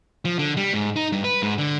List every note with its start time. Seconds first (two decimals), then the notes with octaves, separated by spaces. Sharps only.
0.25 F3
0.39 D3
0.57 G3
0.73 G#2
0.96 D#4
1.12 G2
1.24 B4
1.43 G#2
1.58 D3